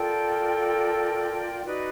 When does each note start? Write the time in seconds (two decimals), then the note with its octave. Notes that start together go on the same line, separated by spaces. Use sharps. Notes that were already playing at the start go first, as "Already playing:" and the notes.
Already playing: F4 A4 A#4 D5 G5
1.65 D#4 F#4 B4 D5